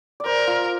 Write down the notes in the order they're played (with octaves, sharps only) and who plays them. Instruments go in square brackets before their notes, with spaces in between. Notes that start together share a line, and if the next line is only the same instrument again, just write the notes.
[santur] D5
[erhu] A#4 [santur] C5
[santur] F4